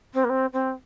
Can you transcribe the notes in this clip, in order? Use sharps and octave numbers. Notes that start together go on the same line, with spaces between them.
C4
A#3
C4
C4